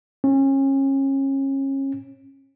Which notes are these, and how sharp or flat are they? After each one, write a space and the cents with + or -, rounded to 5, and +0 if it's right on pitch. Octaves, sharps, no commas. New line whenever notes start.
C#4 -30